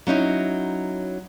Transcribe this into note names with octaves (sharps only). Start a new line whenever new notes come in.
F#3 C#4 D#4 E4